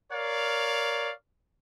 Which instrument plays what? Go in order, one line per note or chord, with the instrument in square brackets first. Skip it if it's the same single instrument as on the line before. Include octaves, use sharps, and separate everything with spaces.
[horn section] A#4 C#5 D5 F5